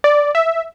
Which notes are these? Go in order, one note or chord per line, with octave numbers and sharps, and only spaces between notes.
D5
E5